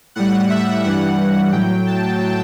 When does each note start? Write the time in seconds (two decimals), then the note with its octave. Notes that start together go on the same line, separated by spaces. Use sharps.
0.15 A2 G3 F#5
0.50 E5
0.84 G2 E3 G3 F#5
1.52 A2 F#3 G5
1.87 A5